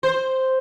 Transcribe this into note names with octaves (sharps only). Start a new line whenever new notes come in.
C5